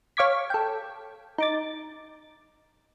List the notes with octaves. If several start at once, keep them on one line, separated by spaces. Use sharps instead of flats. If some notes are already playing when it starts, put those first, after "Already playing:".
C#5 F5 C#6 D6 G#6 B6
A4 G5
D#4 D6 A6